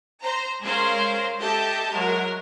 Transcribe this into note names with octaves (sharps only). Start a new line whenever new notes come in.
C5 A#5
G#3 C#4 G#4 A#4 C5 F5
G4 A4 D#5 E5 A5 G6
F#3 G#3 A#4